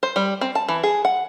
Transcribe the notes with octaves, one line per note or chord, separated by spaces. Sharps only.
C5
G3
C4
A5
E3
G#4
F#5